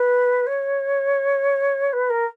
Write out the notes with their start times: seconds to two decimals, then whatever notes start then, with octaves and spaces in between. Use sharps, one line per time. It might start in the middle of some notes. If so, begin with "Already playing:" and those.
Already playing: B4
0.46 C#5
1.92 B4
2.09 A#4